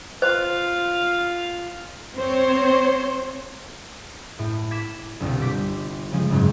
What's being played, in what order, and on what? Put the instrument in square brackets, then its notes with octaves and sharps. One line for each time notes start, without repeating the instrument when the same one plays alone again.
[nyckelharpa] F4 F5 [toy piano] C5
[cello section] C4 C5 C#5
[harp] A2
D6 G#6 B6 E7
G1 C2 B2
C5 D6 B6
C#3 F3 G#3
F#1 G#2